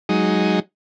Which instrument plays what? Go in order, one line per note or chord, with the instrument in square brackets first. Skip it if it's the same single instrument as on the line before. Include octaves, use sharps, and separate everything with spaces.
[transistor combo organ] F#3 G#3 D#4